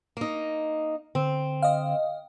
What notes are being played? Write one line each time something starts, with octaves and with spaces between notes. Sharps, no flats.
A#3 D#4
D3 C4
D#5 F5